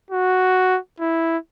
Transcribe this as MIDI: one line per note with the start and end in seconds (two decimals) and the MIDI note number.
0.11 0.78 66
1.00 1.37 64